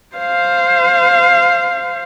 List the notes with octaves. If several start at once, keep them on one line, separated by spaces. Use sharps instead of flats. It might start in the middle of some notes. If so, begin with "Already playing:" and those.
C5 F5